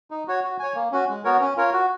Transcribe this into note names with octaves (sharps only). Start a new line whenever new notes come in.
D#4
F#4 C#5
F#4
C#5 G#5
A#3
C#4 F#4
G#3
B3 F#4 A#4 C#5
C#4
F4 A#4 C#5
F#4